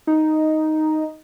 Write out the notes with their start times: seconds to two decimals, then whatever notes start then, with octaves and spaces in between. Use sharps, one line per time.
0.07 D#4